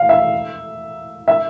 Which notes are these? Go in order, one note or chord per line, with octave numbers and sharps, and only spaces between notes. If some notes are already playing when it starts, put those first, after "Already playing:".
Already playing: F5
E5
E5